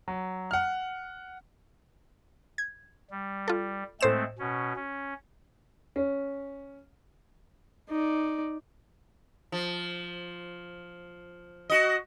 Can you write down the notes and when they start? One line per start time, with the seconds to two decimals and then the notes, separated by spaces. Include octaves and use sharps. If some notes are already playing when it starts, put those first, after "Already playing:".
0.08 F#3
0.51 F#5 F6
2.58 G#6
3.11 G3
3.48 F4 A4
4.01 A2 G#3 A3 C4 C5 E7
4.39 B2 C#4
4.76 C#4
5.96 C#4
7.89 D#4 D5
9.52 F3
11.70 F#4 D#5